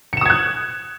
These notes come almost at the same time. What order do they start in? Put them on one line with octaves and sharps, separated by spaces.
C#7 E7 D#6 G#6 F#6